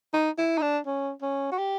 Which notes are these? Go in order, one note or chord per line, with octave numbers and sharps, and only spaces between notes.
D#4
E4
D#4
D4
C#4
C#4
F#4
G4